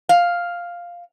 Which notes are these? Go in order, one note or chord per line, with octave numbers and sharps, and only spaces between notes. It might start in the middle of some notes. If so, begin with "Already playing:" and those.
F5